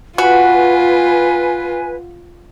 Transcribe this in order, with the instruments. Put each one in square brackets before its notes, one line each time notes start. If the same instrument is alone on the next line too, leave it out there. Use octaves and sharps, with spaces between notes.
[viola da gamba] F4 [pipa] F#4 [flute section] B4 G#5